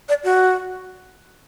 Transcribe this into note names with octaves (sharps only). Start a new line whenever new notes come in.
D5
F#4